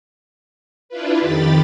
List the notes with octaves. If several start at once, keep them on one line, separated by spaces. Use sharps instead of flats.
D4 E4 F4 B4
F2 D#3 G4 B5 A6